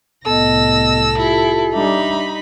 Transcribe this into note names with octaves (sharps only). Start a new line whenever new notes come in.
C2 A2 B3 A4 D#5 E6 A#6
E4 F4 G4
G3 D4 D#4 E5 B5